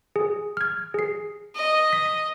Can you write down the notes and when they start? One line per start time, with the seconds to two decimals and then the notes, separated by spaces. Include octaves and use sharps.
0.16 G#4
0.57 F6 G#6
0.94 G#4 C7
1.55 D#5
1.93 B6